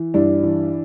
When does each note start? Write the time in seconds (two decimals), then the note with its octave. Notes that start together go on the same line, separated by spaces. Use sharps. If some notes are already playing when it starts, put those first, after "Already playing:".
Already playing: E3
0.14 G2 D4 E4
0.43 E3